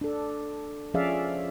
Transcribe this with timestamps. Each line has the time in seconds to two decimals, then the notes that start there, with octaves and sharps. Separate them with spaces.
0.01 D4 A4
0.94 F3 C#4 G#4 D5 E5 F5